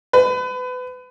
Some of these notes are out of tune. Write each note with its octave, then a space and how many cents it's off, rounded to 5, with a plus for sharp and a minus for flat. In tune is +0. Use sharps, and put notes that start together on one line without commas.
B4 +30